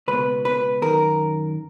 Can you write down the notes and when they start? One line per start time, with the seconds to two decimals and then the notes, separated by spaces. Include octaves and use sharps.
0.08 C#2 B2 B4
0.45 B4
0.82 F#2 D#3 A#4